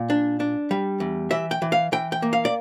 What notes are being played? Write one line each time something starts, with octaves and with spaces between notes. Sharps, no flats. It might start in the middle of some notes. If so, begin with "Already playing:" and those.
Already playing: A#2
D4
D4
G3
E2
E3 E5
G5
E3
F5
E3 G5
G5
A#3
F5
D5